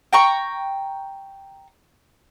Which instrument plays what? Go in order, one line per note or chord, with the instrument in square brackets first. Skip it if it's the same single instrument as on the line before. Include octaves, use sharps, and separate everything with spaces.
[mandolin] G5 A#5 C#6